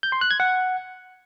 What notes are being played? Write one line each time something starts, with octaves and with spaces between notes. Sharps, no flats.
G6
C6
F#6
G#6
F#5